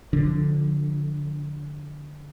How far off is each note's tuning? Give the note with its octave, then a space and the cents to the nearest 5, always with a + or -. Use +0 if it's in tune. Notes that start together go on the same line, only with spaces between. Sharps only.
D3 +0 F3 +25 D4 +0